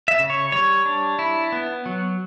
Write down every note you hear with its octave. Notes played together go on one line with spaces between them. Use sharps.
E5
C#3
C#5
G3 C#5
D4
E4
B3
F#3